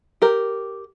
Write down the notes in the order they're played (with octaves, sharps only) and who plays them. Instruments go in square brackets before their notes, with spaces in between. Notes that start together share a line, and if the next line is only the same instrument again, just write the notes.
[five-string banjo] G4 A#4